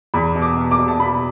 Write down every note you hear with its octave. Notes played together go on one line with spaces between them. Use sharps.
E2 B5
B2
D6
B2
D6
B2
A5
B2 B5